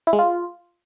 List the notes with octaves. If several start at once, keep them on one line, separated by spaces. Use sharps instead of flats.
E4
G#3
F4